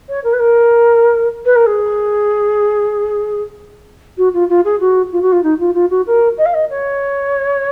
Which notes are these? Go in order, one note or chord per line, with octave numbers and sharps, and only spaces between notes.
C#5
A#4
B4
A#4
B4
A#4
G#4
F#4
F4
F4
G#4
F#4
F4
F#4
F4
D#4
F4
F4
F#4
A#4
D#5
F5
D#5
C#5